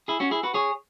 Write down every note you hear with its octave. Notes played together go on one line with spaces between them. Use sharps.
E4 G#4
C#4 F#4
E4 G#4
F#4 B4
G#4 C#5